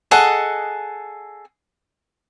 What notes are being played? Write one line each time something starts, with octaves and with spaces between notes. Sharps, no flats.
G#4 A4 D#5 F#5